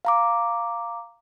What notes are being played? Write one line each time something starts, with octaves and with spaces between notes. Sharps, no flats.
F5 A#5 D6